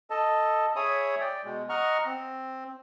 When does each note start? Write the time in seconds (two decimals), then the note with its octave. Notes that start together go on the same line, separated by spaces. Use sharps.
0.10 A4 D#5 A5
0.76 G#4 C#5 E5 G#5 B5 D#6
1.21 D5 G5
1.45 B2 G#3
1.69 D#5 F#5 A#5 C#6 F6
2.06 C4